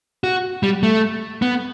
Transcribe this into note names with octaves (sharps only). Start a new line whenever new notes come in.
F#4
G3
A3
B3